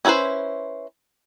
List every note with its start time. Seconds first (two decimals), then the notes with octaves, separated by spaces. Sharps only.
0.05 C#4 E4 G#4 B4 C5